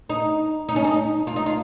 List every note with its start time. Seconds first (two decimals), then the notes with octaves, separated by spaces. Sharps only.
0.09 D#4
0.69 D#4
0.76 C#4
0.84 D#4
1.27 F4
1.36 D#4
1.46 F4